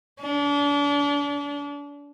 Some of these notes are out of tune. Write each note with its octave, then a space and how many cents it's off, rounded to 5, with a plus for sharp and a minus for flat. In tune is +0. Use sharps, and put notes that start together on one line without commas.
D4 -35